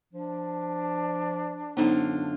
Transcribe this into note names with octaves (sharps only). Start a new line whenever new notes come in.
F3 D4
F#2 D3 B3 D#4 F4 C5